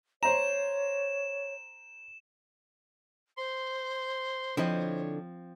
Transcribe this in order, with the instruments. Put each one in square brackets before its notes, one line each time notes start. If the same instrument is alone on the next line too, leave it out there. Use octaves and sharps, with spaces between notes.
[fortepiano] C5 A#5 [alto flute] C#5 [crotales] E7
[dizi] C5 [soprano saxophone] C6
[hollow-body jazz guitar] D3 E4 D#5 [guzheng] F3 C4 [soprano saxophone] C#5